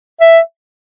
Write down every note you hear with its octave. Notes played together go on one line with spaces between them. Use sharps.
E5